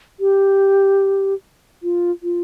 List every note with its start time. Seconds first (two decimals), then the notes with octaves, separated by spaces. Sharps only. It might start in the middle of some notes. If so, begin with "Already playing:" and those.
0.20 G4
1.83 F4
2.23 F4